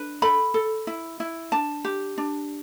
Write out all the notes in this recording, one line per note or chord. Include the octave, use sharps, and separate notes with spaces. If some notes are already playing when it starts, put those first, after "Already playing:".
Already playing: D4 B4
A4 B5
A4
E4
E4
D4 A5
G4
D4